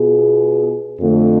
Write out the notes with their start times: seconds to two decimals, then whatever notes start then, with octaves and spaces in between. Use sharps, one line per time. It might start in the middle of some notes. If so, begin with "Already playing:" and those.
Already playing: B2 B3 F4 G#4
1.00 F2 D3 A3